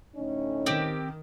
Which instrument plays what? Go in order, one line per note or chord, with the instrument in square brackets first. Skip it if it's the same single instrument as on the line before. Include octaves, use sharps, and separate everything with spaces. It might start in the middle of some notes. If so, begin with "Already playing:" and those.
[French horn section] D2 A2 C#4 [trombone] D#4
[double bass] D#3 [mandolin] C4 G4